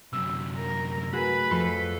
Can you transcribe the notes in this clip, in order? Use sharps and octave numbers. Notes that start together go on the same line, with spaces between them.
F#2 C3 F#3 E6
A#4
A3 F#4 G#4 B4 B5
F2 A4 C6